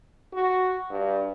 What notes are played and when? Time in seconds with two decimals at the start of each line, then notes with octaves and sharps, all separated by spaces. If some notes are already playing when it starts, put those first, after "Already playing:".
0.33 F#4
0.90 G2